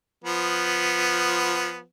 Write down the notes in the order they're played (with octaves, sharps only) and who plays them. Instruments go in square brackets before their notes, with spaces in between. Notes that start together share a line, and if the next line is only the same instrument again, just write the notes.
[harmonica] F3 B3